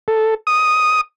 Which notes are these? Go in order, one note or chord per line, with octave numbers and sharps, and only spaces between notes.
A4
D#6